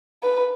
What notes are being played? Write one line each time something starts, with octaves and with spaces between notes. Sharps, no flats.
B4